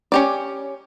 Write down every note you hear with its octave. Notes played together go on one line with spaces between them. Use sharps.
C#4 G4 D5